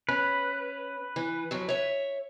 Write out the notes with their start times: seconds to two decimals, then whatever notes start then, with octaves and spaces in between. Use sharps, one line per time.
0.09 C#4 B4
1.16 E3
1.51 F2 F#3
1.69 C#5 E5